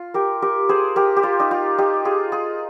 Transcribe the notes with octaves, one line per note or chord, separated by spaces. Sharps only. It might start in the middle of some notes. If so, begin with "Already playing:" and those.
Already playing: F4
G4 A#4
G4 A#4
G#4 C5
G4 A#4
G4
F4
D#4
F4
D#4 G4
F4 G#4
F4 G#4